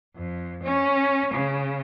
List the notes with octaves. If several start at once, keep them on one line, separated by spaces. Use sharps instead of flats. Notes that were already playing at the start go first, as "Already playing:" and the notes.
F2
C#4
C#3